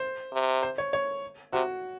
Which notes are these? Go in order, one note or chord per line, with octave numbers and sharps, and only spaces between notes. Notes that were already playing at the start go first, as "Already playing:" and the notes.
Already playing: C5
C3
C5
C#5
C#5
C3 F#4